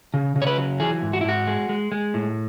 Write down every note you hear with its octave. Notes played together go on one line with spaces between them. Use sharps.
C#3
C#3
C#5
B4
F#3
E3 G#4
G#2
F#4
E4
G#2 F#4
G#3
G#3
G#3
A2